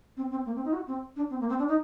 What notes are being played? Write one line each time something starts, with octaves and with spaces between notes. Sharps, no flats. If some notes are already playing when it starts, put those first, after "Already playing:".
C4
C4
A#3
C4
D#4
F#4
C4
D4
C4
A#3
C4
D4
D#4